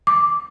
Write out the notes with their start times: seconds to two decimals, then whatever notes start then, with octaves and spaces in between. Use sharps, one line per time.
0.07 D6